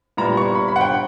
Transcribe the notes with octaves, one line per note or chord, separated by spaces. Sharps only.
A#2 G3 B3 E4 A#5
C#6
B5
B5
F#5
G5